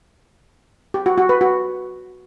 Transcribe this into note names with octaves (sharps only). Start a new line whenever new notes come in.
G4
F#4
F#4
B4
F#4